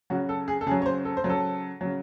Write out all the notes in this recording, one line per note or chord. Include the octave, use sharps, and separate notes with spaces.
C#3 F#3 F#4
A4
G#4
A4
C#3 F#3 G#4
C#5
C5
A4
C5
C#3 F#3
A4
C#3 F#3